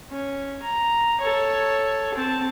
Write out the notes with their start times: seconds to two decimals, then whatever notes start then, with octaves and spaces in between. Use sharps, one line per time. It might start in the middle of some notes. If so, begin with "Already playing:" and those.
0.11 C#4
0.62 A#5
1.20 A4 C#5
2.15 C4 A5